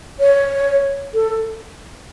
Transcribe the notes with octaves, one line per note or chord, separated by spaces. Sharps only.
C#5
A4